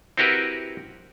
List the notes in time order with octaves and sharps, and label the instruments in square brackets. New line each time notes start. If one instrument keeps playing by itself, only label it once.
[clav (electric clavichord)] C4 E4 F#4 G4 A#4 B4